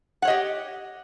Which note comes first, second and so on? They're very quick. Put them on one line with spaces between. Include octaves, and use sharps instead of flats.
F#5 C#5 D#5 G4